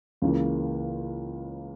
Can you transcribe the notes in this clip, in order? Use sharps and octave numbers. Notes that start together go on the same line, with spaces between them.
C#2 C#3 E3 A#3